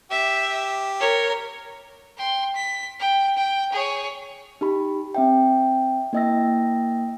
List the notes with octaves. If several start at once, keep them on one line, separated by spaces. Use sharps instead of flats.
G4 E5
A#4 C#5
G5 C6
B6
G5
G5
G#4 C#5
D#4 G4 B5
C4 E5 G5
A#3 E4 D#5 G5 E6 A#6